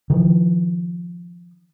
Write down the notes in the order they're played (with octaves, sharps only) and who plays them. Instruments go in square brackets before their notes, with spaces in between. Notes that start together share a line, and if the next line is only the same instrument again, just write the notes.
[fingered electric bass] D#3 F3